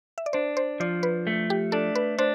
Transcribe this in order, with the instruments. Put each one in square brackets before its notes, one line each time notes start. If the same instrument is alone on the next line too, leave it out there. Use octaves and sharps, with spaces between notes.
[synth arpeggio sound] E5
D5
[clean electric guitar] D4 [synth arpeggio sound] C5
[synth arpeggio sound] C5
[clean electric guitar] F3 [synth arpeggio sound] D5
[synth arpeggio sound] B4
[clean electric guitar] A3
[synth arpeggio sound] G4
[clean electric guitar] D4 [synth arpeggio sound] A4
[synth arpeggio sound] B4
[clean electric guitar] D4 [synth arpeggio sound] C5